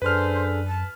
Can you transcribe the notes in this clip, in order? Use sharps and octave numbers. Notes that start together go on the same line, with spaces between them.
F#2 D4 G#4 A4 B4 C5 F6
A5